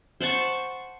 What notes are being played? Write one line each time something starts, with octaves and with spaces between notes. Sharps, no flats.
C5 F#5 A5 C#6